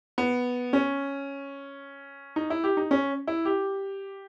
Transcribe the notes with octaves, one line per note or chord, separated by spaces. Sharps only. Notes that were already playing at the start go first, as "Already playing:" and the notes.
B3
C#4
D#4
E4
G4
D#4
C#4
E4
G4